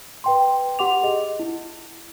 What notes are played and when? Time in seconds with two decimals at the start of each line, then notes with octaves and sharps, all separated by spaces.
0.24 B4 G5 C6
0.79 G4 F#5 C6 D6 F7
1.03 G#4 D#5
1.39 E4